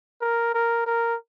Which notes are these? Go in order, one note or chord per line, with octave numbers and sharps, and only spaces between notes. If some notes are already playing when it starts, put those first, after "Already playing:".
A#4
A#4
A#4